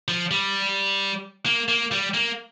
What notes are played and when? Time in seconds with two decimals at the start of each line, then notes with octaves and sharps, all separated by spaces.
0.08 F3
0.31 G3
1.46 A#3
1.69 A#3
1.92 G3
2.14 A#3